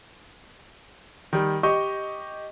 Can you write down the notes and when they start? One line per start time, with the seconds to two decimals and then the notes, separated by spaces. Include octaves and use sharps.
1.33 D#3 G3
1.63 G4 D#5 C#6